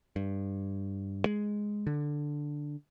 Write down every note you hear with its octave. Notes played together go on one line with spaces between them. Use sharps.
G2
G#3
D3